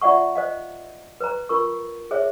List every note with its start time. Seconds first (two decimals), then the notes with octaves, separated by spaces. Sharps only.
0.02 F4 D5 E5 F#5 C#6
0.35 C5 D#5 F5
1.20 B4 C5 A#5
1.49 F4 A#4 C#6
2.11 G#4 C5 C#5 E5